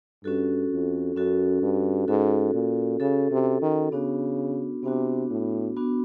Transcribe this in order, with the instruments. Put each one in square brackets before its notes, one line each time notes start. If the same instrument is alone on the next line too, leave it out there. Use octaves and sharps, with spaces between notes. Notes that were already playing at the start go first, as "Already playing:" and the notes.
[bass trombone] G2 [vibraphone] C#4 F#4 A4
[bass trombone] F2
[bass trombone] F#2 [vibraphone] C#4 F#4 A4
[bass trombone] G2
[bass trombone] G#2 [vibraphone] C#4 F#4 A4
[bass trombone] A#2
[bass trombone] C#3 [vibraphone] C#4 F#4 A4
[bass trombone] C3
D#3
[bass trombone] C#3 [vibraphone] B3 D4 F#4
[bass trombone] C3 [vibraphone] B3 D4 F#4
[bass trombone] A2
[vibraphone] B3 D4 F#4